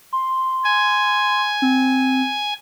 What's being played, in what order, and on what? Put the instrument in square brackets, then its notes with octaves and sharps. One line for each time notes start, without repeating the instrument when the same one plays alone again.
[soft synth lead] C6
[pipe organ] G#5
[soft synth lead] C4